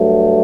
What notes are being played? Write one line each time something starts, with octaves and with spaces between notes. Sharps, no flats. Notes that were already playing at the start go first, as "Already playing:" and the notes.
Already playing: G2 F#3 A3